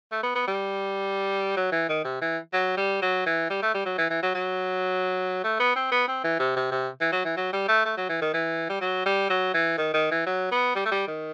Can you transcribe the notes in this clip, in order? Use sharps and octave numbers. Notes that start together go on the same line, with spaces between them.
A3
B3
B3
G3
F#3
E3
D#3
C3
E3
F#3
G3
F#3
E3
G3
A3
G3
F#3
E3
E3
F#3
F#3
A3
B3
C4
B3
C4
E3
C3
C3
C3
E3
F#3
E3
F#3
G3
A3
A3
F#3
E3
D#3
E3
G3
F#3
G3
F#3
E3
D#3
D#3
E3
F#3
B3
G3
A3
G3
D#3